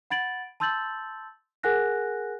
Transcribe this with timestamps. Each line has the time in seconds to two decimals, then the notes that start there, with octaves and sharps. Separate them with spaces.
0.10 F#5 B5 G#6 A6 D7 F#7
0.60 A5 C6 E6 G6 A6 F#7
1.63 G#4 A#4 F#5 G#5 F#6 A#6